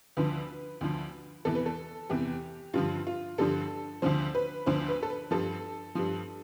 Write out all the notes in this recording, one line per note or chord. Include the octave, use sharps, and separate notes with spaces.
D2 D3 F3 B4
D2 D3 F3
E2 C3 E3 A4
B4
A4
E2 C3 E3 G4
G2 D3 F3 F4
F4
G2 D3 F3 A4
D2 D3 F3 C5
B4
D2 D3 F3 C5
B4
A4
B4
G2 F3 A4
G2 F3